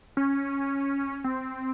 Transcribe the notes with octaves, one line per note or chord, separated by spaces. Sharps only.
C#4
C4